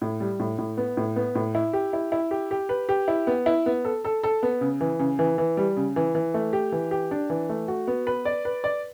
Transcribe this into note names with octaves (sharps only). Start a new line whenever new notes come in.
A2
G3
A2
A2
B3
A2
B3
A2
E4
G4
E4
E4
G4
G4
B4
G4
E4
B3
E4
B3
A4
A4
A4
B3
C#3
E3
C#3
E3
E3
G3
C#3
E3
E3
A3
G4
E3
G4
D4
E3
A3
F#4
B3
B4
D5
B4
D5